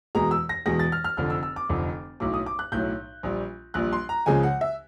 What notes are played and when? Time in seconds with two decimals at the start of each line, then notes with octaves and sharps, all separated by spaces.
0.15 E2 B2 G#3 A#5
0.31 E6
0.49 A#6
0.66 E2 B2 G#3 A#6
0.79 A6
0.92 F6
1.04 F6
1.17 F1 F2 D3 F6
1.30 E6
1.43 E6
1.56 D6
1.69 F1 F2 D3
2.20 B1 A2 F#3 D6
2.34 D#6
2.46 D6
2.59 F#6
2.72 B1 A2 F#3 G6
3.23 A#1 A#2 G3
3.74 A#1 A#2 G3 F#6
3.92 C6
4.09 A#5
4.26 C#2 C#3 F3 G#3 G#5
4.43 F#5
4.61 E5